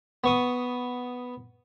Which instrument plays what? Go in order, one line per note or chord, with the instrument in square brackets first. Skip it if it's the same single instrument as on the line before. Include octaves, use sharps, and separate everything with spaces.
[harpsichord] B3 C#6 D#6